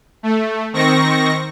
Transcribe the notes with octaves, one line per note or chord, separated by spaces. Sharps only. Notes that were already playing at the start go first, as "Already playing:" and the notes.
A3
D#3 C4 C#6 A#6